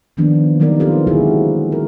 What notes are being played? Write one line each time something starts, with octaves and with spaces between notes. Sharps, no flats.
D#3 F3 A#3 B3 D4
F#3 G3 B3 D#4 A#4 D5
A#3 C4 F4 G4 A4 A#4
D3 G#3 C4 E4 F#4 G#4
A#4